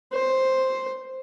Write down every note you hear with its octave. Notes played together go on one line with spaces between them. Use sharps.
C5